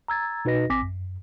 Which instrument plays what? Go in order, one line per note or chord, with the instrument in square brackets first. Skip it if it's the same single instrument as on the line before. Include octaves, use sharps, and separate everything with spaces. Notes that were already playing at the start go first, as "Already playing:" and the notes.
[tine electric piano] A#5 E6 G#6 A6
B2 D#4 F#4 B4 D#5 A#6
A1 C4 G#5 D6 A#6 B6
F#2